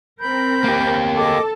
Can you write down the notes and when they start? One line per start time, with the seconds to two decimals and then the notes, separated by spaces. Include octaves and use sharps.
0.20 C4 A#4 B5 G6
0.64 A#3 G4
1.16 G#4 A4 D#5 D6